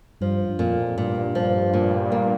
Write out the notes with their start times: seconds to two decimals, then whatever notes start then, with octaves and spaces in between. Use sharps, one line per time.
0.21 G2 F3
0.49 G2
0.59 F2 A#2
0.97 G2 A#2
1.35 F3
1.74 A#2
2.12 A#3